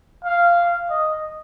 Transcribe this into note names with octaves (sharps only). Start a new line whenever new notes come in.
F5
D#5